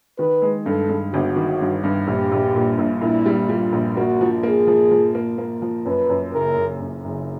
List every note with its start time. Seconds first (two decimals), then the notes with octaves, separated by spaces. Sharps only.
0.19 D#3 B4
0.42 G#3
0.66 G2 A4
0.89 G2
1.13 G1 F#4
1.36 D#3
1.61 G2
1.84 G2
2.07 A#1 G4
2.32 A#1
2.55 A#2
2.78 A#1
3.02 A#2 E4
3.26 G3
3.49 G3 F4
3.72 A#1
3.97 A#3 F#4
4.21 F3
4.43 A#3 G#4
4.67 F3
4.91 F3
5.15 A#3
5.38 A#3
5.62 F3
5.86 F#2 B4
6.10 F#2
6.33 F#1 A#4
6.57 F#1
6.80 F#2
7.04 F#1